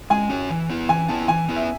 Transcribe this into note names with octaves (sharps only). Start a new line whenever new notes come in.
G#3 G#5
C#4 F#4 C#5
E3
B3 E4 B4
E3 G#5
B3 E4 B4 A5
E3 G#5
B3 E4 B4
E5